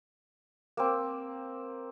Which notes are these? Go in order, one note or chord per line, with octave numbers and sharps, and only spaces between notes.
A#3 C4